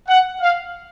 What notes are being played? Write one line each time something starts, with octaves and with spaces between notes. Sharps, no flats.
F#5
F5